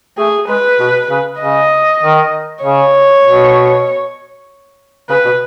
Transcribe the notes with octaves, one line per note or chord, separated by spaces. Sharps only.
A3 G#4
G#3 B4
B2
C#3
C#3 D#5
D#3
C#3 C#5
B2
C#3 B4
B2